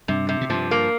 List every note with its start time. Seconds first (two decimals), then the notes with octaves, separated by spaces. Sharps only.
0.08 G2 C3
0.29 C3
0.41 A#2
0.50 G2 F3
0.71 A#3